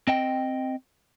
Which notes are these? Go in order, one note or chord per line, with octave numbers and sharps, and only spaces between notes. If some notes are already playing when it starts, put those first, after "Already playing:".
C4 D#5 G5